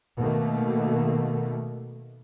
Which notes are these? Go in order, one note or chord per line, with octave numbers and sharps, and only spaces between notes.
B2 D#3 A3 A#3